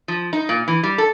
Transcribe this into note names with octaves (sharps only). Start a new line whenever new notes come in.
F3
D#4
A#2
E3
G3
A4